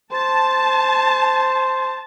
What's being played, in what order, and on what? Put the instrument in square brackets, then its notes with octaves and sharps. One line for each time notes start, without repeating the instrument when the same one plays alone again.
[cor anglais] C5 [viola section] A5